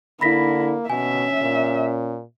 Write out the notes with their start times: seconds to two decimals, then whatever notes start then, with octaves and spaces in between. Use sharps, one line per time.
0.21 D3 A#3 E4 B5 A#6 B6
0.90 B2 C#4 E5 G#5
1.42 A#2